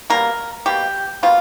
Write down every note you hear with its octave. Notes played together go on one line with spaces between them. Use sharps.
B2 G3 A#3 A#4
B2 G3 A#3 G4
B2 G3 A#3 F4